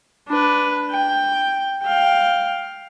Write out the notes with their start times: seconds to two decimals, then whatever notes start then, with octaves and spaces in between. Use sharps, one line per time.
0.28 D4 B4
0.91 G5
1.83 F5 G5